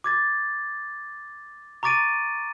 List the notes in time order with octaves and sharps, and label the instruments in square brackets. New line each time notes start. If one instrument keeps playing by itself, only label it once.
[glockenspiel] D6 G#6 A6
A#5 C#6 D6 A6 D7 D#7